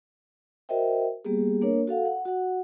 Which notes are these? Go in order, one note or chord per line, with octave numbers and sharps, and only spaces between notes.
F#4 A#4 C5 D#5 E5 G5
G3 A#3 B3 G4 G#4
A#3 D4 A#4 C#5
F#4 A4 F5 F#5
F#5
F#4 F#5